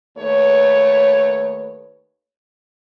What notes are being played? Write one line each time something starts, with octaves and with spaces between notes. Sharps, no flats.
D#2 A3 B4 C#5